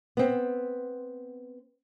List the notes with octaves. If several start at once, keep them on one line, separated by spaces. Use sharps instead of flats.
B3 C4